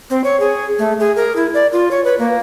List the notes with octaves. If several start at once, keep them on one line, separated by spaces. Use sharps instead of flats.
C4
C#5
G#4
A3
G#4
A#4
E4
D5
F4
C#5
B4
A#3